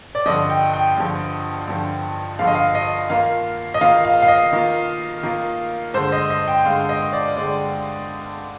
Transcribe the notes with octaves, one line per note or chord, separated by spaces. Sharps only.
D5
G2 D3 F3 D#5
G5
G5
G2 D3 F3
G2 D3 F3
G2 D3 F3 F5
D#5
F5
D#5
D#3 A#3 F4 F5
D#5
D#3 A#3 F4 F5
F5
F5
D#5
D#3 A#3 F4
D#3 A#3 F4
G2 D3 G#3 C5
D#5
D#5
G5
G2 D3 G#3 F5
D#5
D5
D3 G#3 D5